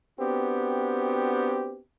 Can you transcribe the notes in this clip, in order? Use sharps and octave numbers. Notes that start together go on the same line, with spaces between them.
B3 C4 D4 F#4 G4